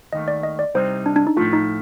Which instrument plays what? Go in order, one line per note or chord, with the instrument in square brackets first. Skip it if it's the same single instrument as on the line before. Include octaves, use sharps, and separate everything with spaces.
[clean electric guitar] D#2 D#3 A3 [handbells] D#5
[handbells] D5
D#5
D5
[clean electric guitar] C2 C3 G3 C4 D#4 [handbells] C5
[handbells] D4
D4
D#4
[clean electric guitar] A2 F3 A3 [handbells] F4
[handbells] D#4